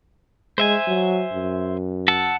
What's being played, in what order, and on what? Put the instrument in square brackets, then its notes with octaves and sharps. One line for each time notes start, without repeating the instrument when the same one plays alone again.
[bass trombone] G#3 [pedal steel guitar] C5 E5 G#5
[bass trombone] F#3
F#2
[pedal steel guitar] F#5 A5 E6